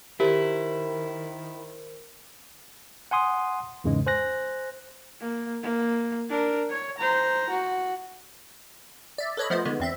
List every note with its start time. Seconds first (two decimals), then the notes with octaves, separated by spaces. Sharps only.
0.20 D#3 E4 G4 A#4 C5
3.11 F#5 G#5 C6 D#6
3.84 E2 G#2 C#3 E3 G#3
4.06 C5 G#5 F#6 A#6
5.21 A#3
5.63 A#3
6.30 D4 A#4
6.70 C#5
6.98 C5 A#5
7.50 F#4
9.18 D5 E5
9.37 A4 B4 C#5 D#5 B5
9.50 F3 A3 B3 C5 D#5
9.65 D3 D#3 G#3 B3
9.80 E2 C4 E5